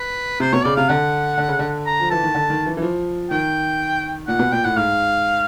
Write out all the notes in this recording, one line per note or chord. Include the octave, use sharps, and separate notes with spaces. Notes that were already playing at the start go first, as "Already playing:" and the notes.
Already playing: B4
C3 C5
B2 C#5
C#3 D5
C3 F5
D3 F#5
D3
C#3
D3
A#5
F3
E3 A5
D#3
D3
D#3
E3
E3
F3
D#3 G5
A#2 F#5
B2
A#2 G5
A2 F#5
G#2 F5